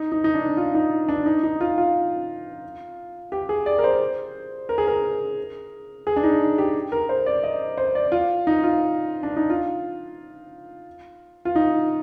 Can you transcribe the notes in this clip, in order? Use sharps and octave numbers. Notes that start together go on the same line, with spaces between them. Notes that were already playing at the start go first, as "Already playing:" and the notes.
Already playing: D#4
D#4
D#4
D4
F4
D#4
D4
D#4
D#4
F4
F4
G4
G#4
D5
A#4
C5
A#4
G#4
A#4
G#4
D4
D#4
G4
A#4
C5
D5
D#5
C5
D5
F4
D#4
F4
D4
D#4
F4
F4
D#4